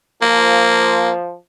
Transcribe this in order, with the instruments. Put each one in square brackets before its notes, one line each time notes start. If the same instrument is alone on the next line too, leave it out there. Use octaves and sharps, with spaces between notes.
[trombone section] F3 [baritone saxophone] A#3